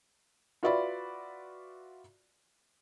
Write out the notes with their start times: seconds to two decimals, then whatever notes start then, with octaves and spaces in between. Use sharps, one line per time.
0.63 F4 F#4 B4 D5 E5 B5